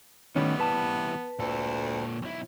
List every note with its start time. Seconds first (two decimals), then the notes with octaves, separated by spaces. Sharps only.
0.36 A2 D#3 E3 G3 B3 C#4
0.60 B4 A5
1.39 D2 A#2 A4
2.22 B1 E4